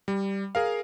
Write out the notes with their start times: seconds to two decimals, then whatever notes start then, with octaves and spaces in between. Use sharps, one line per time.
0.08 G3
0.55 G#4 A#4 F5